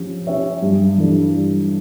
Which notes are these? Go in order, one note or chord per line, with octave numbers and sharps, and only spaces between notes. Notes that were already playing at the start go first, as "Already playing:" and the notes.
Already playing: F3 C#4 G4
C#4 G4 C#5 E5
G2
E3 G3 D4 A4
G2